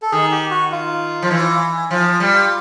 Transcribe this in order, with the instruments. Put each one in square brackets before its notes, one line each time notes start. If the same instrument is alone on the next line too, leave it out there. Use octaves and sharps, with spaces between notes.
[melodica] A4
[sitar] D#3 [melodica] G#4
[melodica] G4
F#4
F4
[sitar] F3
E3
[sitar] F3 [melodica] F4
[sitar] G3